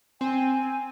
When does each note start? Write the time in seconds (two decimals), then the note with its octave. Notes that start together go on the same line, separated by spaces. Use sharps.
0.21 C4 G#5